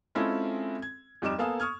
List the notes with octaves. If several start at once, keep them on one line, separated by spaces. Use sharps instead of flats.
G#3 C4 C#4 E4 F4 A4
G#6
F2 G3 D#4 D6 E7
A#3 B3 A4 F5 G#5 D#6
C#6 D#6 F6 G#6